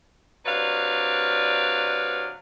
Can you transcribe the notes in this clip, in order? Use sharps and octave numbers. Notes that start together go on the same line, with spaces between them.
C3 F#3 D4 B4 D5 F5